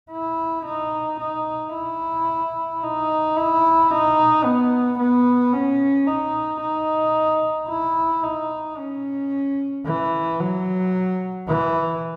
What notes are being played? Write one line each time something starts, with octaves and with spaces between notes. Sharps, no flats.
E4
D#4
D#4
E4
D#4
E4
D#4
B3
B3
C#4
D#4
D#4
E4
D#4
C#4
E3
F#3
E3